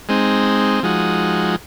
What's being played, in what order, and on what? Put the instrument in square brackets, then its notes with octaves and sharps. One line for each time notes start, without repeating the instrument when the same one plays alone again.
[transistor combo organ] G#3 C4 D#4
F3 G#3 D#4 F#4